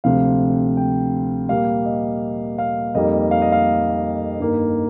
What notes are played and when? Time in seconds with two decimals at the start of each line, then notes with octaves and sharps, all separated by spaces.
0.04 D2 C3 F3 C4 F5
0.77 G5
1.49 A#2 G3 A#3 F5
1.85 D#5
2.58 F5
2.95 F2 D#3 G3 A#3 D#5
3.31 F5
3.42 D#5
3.52 F5
4.40 G2 D#3 A#3